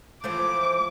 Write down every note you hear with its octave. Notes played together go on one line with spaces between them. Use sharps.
E3 F3 A3 D6